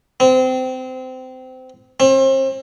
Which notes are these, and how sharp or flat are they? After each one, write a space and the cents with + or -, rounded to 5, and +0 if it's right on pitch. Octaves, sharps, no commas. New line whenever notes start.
C4 -25
C4 +35